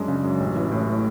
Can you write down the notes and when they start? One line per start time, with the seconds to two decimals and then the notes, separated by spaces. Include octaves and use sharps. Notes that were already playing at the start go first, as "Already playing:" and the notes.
Already playing: F#2 G#3 D4
0.08 C#3
0.24 F#2
0.40 A1
0.56 E3
0.72 A2
0.87 A3